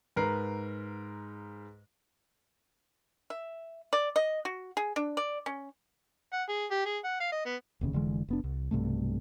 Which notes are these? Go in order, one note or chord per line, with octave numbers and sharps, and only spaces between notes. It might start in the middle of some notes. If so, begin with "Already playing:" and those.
G#2 A#4 B4 C7
E5
D5
D#5
F#4
G#4
D4
D5
C#4
F#5
G#4
G4
G#4
F#5
F5
D#5
B3
E1 D#2 C#3
F1 D3 E3 G#3
F1 B3 D4
C2
B1 G2 C3 A3